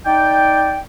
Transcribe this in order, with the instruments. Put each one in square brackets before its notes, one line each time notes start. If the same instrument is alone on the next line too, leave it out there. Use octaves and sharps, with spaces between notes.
[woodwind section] D#4 D5 G5